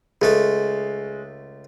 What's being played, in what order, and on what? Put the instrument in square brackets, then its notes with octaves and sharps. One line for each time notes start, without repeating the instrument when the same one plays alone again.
[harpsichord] C#2 A3 A4 [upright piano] G#3